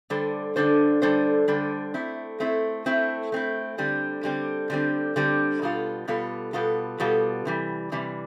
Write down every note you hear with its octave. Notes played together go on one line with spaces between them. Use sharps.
D3 G3 D4 A4 C5
D3 G3 D4 A4 C5
D3 G3 D4 A4 C5
D3 G3 D4 A4 C5
A3 C4 E4
A3 C4 E4
A3 C4 E4
A3 C4 E4
D3 G3 C4
D3 G3 C4
D3 G3 C4
D3 G3 C4
B2 G3 B3 F4 A4
B2 G3 B3 F4 A4
B2 G3 B3 F4 A4
B2 G3 B3 F4 A4
C3 E3 G3
C3 E3 G3